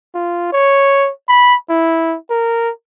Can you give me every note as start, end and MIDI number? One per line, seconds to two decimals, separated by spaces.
0.15 0.50 65
0.53 1.11 73
1.28 1.56 83
1.70 2.16 64
2.30 2.71 70